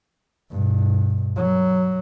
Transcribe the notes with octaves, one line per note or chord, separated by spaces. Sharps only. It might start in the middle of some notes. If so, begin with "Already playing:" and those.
G2 B2
F#3